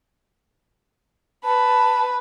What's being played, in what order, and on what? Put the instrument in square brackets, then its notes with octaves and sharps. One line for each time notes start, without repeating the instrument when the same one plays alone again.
[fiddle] B4 [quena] A5